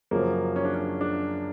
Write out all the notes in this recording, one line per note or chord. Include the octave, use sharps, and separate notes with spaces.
F#2 C#3 F3 A#3
C#4
D4
C#4
D4